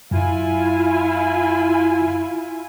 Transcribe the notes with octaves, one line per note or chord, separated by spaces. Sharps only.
F#2 E4 F4 G#5